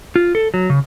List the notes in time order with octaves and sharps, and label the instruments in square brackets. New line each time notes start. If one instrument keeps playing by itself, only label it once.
[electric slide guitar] F4
A4
F#3
C#3